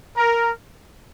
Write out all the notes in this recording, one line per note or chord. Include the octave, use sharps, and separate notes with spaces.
A#4